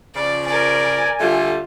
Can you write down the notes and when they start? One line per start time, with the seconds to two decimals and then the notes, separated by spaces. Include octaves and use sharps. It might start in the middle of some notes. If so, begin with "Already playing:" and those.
0.15 C#3 F3 D5
0.46 A#4 D5 G#5
1.20 D3 G3 A3 F4